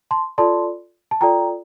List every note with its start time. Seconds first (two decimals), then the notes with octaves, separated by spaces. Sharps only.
0.11 A5 C6
0.38 F4 A4 D5 A5 C6
1.11 A5
1.21 F4 A4 D5 G5 A#5